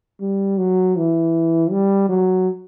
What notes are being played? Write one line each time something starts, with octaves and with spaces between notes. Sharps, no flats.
G3
F#3
E3
G3
F#3